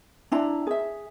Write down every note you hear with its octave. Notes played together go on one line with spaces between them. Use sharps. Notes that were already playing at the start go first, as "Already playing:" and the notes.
D4 E4 A#5
G#4 E5